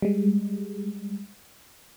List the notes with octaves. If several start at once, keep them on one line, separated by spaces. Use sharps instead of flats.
G3 G#3